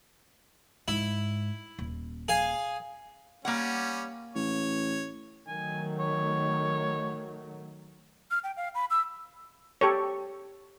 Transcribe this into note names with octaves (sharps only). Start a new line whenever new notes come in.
G#2 E4
D#1
G#4 F5 G#5
G3 A#3 C#4 F#5
A1 C#5
D#3 F#3 A3 G#5
C#5
F6
G5
F5
B5
E6
G4 A4 C#5